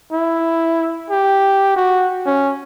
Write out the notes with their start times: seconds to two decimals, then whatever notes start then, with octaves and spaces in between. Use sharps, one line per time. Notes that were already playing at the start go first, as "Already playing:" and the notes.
0.12 E4
1.10 G4
1.76 F#4
2.26 C#4